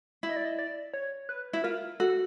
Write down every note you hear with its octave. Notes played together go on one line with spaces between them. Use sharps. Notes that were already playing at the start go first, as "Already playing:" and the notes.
E4
D#5
D5
D#5
D5
C#5
B4
E4
F4 A#4
F#4 A4